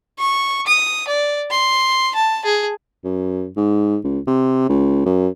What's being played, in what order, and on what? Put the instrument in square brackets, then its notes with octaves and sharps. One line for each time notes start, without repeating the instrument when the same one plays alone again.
[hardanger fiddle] C#6
D#6
D5
C6
A5
G#4
[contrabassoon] F#2
G#2
C#2
C3
C#2
F#2